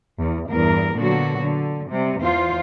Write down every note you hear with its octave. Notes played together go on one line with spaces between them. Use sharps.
E2
E2 G2 A#4
A#2 D3 F#3 B3 F#4
D3
C3 G3
E2 E3 F4 C5